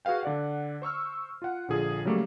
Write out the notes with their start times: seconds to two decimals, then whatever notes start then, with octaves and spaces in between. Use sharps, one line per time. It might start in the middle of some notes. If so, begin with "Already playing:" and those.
0.05 F#4 G#4 B4 F5 G5
0.23 D3 D5 F#5
0.82 C5 C#6 E6 F6
1.42 F4 F#5
1.68 A#1 D3 F3 G#4
2.05 C#3 F#3 G3 A3 A#3